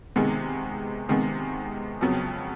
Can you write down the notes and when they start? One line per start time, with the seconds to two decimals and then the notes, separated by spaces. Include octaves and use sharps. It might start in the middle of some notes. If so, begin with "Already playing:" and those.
0.16 C3 D#3 G#3 B3
1.09 C3 D#3 G#3 B3
2.01 F2 C#3 F#3 B3